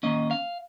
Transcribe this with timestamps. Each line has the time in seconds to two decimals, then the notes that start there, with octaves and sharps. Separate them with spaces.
0.03 D#3 A#3 C#4 D#5
0.31 F5